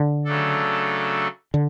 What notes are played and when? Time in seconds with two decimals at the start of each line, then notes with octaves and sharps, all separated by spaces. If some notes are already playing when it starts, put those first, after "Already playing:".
Already playing: D3
0.25 C#3 F#3 A3 D4 A4
1.54 D3